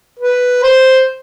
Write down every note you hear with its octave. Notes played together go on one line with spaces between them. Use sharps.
B4
C5